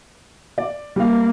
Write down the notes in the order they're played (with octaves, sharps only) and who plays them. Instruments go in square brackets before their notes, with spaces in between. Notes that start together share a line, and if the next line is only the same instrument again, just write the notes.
[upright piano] D5
[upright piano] G3 F5 [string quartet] A#3